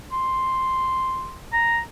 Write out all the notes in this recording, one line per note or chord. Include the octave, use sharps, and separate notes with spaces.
C6
A#5